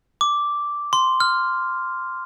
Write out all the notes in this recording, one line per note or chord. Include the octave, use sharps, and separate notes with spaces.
D6
C6
F6